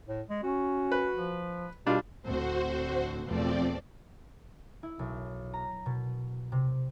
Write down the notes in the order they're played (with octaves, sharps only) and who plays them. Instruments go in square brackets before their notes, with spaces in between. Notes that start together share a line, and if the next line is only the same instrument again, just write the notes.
[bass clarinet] A2
G#3
[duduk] C#4 [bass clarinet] F#4
[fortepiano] B4
[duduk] F3
[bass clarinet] B2 [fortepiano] G3 D4 F4
[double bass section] D2 A2 C4 [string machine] F#4 C5
[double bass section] E2 B2 A3 [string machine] F3 C4 D5
[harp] E4
B1
A#5
B2
C3